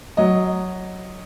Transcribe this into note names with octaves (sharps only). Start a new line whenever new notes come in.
F#3 D#5